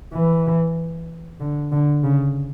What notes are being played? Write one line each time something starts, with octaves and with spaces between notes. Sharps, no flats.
E3
D3
D3
C#3